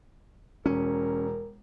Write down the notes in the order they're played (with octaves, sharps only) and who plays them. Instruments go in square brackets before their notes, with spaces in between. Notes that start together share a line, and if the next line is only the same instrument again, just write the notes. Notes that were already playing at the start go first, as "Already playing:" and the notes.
[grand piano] E1 [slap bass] C#4 [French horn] A#4